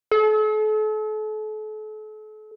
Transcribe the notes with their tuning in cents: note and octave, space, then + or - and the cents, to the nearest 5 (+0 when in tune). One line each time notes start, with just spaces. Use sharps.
A4 -40